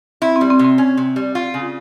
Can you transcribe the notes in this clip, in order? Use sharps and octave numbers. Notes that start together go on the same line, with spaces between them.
C4 E4
G3 C4
C4
C3
C4
C#4
C3
G3
F4
C#3